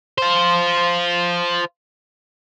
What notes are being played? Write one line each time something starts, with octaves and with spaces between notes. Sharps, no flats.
F4 C5